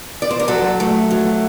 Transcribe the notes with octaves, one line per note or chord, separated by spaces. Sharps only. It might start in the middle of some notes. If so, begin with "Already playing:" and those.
D5
C5
A#4
F#3 A4
A3
F#3